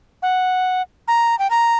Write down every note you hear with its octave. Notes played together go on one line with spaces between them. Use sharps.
F#5
A#5
G5
A#5